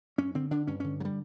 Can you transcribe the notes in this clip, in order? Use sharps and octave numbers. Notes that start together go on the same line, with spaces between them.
F#2 C#4
D3 C4
D3 D4
G2 C#4
D3 C#4
D3 F#3 G3